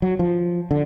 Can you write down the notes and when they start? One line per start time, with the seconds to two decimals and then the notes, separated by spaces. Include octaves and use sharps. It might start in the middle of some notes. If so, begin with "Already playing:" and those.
0.02 F#3
0.19 F3
0.71 D3